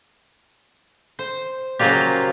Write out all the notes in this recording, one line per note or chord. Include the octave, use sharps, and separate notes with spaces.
C5
C#3 F3 F#3 A#3 F4 G4